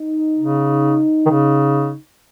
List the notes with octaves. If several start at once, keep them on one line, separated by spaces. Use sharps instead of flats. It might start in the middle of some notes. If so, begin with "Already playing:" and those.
Already playing: D#4
C#3
D#3
C#3